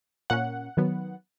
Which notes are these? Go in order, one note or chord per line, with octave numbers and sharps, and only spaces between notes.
A#2 A#3 C#4 F#5
D#3 F#3 B3